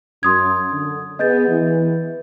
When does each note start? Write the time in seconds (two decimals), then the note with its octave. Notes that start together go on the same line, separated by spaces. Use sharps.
0.23 F#2 C6 D#6 G#6
0.71 D3
1.19 B3 G#4 D#5 G6 A6
1.48 E3